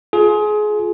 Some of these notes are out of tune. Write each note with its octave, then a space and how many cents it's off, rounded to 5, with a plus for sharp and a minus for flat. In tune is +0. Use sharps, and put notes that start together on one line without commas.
F4 +10 G#4 +25